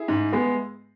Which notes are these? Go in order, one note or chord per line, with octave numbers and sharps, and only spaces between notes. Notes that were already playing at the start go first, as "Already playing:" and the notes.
Already playing: E4 G#4
G#2
G#3 B3